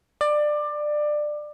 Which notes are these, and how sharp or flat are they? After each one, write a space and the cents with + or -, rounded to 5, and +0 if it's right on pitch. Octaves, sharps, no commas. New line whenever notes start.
D5 +20